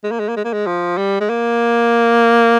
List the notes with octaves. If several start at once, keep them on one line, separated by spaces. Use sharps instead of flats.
G#3
A#3
G#3
A#3
G#3
A#3
G#3
F3
G3
G#3
A#3